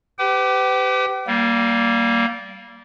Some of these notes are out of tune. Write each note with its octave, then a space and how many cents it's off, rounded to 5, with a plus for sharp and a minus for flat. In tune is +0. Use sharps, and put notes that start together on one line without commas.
G4 +0 B4 +40 G5 -40
G3 -20 A#3 +0